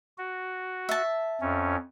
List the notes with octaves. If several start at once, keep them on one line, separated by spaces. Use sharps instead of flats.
F#4
E5 A5
F2 C#4